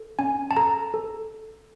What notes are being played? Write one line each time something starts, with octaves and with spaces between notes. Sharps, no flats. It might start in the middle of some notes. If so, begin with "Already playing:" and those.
Already playing: A4
C#4 G#5
A5
A4 A#5
A4